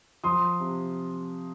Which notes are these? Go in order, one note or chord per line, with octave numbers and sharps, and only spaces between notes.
F3 C6 D#6
C3